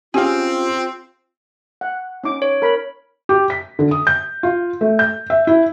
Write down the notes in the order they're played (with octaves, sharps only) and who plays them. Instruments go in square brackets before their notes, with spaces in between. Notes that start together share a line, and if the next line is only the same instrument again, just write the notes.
[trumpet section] C4 [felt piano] C#4 G4 [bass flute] F4 [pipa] G#4 F5
[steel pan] F#5
C#4 D#4 D6
[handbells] C#5
[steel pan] A#4 B5
[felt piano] G4
B6
D3
D#6
G6
F4
A3
G6
E5
E4